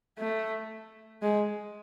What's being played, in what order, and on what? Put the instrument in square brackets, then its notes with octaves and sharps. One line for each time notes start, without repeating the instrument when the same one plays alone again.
[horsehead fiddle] A3
G#3